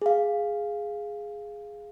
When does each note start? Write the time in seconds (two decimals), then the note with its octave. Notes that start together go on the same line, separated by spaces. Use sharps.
0.02 G#4 F5